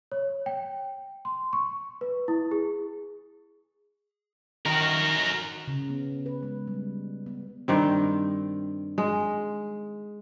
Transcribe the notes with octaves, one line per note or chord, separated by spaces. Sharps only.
C#5
G5
C6
C#6
B4
E4
G#4
D#3 F#4 A#4
C#3
B3
B4
G#3
G3
B3
G2 D#3 C4
G#3